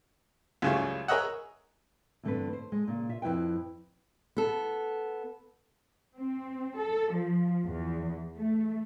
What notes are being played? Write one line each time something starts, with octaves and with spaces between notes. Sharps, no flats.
C#2 F#2 C#3 G3 A3
G#4 A#4 C#5 D#5 E5 F#5
E2 G2 D3 A3 C4 B4
C5
G#3
A#2 C#3
F4 E5
F2 E4 F4 B4 G5
B3 A4
C4
A4
F3
E2
A3